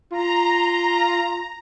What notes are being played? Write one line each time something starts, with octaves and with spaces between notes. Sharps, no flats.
F4 A#5